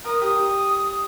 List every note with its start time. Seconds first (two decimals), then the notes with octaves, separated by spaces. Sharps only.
0.04 A#4 D#6
0.20 G4 D#6
0.36 G4